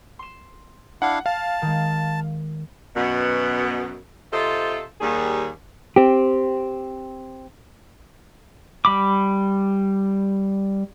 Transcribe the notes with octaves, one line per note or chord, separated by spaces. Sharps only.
C6 E7
D4 E4 F5 F#5
F5 A5
D#3 G#3
F#2 B2 B3
C3 F4 A4 C5 D#5 E5
D#2 G3 G#4
C4 G4
G3 B5 D6